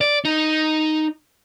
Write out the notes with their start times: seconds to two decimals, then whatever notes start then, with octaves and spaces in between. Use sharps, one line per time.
0.01 D5
0.25 D#4